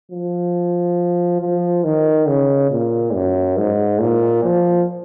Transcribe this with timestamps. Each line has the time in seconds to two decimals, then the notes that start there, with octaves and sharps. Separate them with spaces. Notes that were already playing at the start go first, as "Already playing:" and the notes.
0.12 F3
1.41 F3
1.84 D#3
2.28 C#3
2.71 A#2
3.14 F#2
3.58 G#2
4.01 A#2
4.44 F3